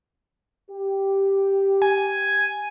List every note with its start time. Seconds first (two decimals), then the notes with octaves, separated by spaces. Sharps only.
0.71 G4
1.82 G#5